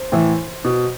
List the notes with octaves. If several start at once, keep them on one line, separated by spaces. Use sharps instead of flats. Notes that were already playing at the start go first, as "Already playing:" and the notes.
Already playing: C5
A2 E3
B2